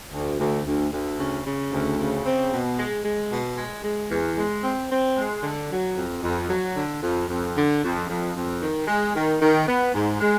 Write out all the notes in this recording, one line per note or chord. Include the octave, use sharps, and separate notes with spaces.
D2
D2
D2
D2
C#3
C#3
D2
C#3
C4
B2
G#3
G#3
B2
G#3
G#3
E2
G#3
C4
C4
G#3
D3
F#3
F2
F2
F#3
D3
F2
F2
D3
F2
F2
F2
D#3
G#3
D#3
D#3
B3
G#2
G#3